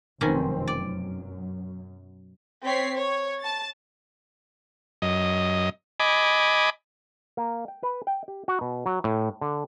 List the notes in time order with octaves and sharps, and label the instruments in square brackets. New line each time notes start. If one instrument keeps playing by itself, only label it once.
[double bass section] F1 F#2 C4 [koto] B2 D#3 C#4
[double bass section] F#2 [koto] D5
[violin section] C4 C#5 B6 C7
C#5
A5 A6
[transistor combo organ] F#2 D#5
D#5 G#5 B5 D6
[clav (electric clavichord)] A#3
G5
B4
G5
G4
F#4
B2
F#3
A2
D3